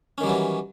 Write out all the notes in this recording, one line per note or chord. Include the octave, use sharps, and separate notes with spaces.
D#3 E3 F#3 G3 C#4